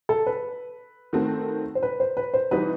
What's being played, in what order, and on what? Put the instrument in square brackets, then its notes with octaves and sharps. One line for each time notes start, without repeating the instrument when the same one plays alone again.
[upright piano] A4
B4
[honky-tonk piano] D#3 A3 C4 F#4 A4
[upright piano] C5
B4
C5
B4
C5
[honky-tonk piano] C3 E3 G3 D#4 F#4 [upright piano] B4